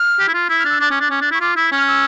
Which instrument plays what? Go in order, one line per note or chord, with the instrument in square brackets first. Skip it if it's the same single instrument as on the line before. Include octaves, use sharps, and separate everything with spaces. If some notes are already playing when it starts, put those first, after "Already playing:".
Already playing: [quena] F6
[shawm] G4
E4
F4
[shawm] E4 [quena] E6
[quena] F6
[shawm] D4 [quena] E6
[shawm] D4 [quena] D6
[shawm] C#4
D4
C#4
D4
[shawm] E4 [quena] C#6
[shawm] F4 [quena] D6
[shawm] E4 [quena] E6
[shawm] C#4 [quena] F6
[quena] E6